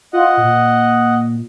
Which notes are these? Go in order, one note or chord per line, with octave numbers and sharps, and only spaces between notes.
F4 D#5 F#5
A#2